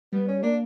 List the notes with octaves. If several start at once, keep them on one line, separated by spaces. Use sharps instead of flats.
G3 B3
C#4
A#3 D4